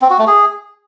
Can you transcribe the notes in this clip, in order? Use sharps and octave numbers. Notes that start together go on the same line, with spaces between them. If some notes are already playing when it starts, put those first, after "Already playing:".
C4
F#4
A3
G#4